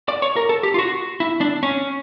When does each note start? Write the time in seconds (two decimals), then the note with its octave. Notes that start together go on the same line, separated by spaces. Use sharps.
0.08 D5
0.22 C#5
0.36 A#4
0.49 A4
0.63 G4
0.74 F4
0.79 F#4
1.20 E4
1.41 D4
1.63 C#4